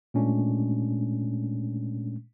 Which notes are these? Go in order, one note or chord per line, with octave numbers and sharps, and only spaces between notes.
A#2 G#3 A3 C#4 D4